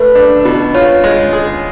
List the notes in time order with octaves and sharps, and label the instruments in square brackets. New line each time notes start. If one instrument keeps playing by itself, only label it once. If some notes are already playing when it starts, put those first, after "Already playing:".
Already playing: [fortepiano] A3 [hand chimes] B4
[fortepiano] D4
B2
[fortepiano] F4 [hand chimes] C#5
[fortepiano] G#3
G#4